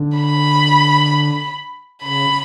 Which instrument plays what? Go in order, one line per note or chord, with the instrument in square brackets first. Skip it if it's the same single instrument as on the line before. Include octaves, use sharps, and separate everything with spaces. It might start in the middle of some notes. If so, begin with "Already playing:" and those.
Already playing: [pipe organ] D3
[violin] B5
[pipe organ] C#3 [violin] B5